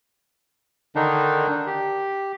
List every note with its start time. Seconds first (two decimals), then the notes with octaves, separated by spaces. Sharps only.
0.96 D3 D#3 D4 D#4
1.50 D4
1.67 G4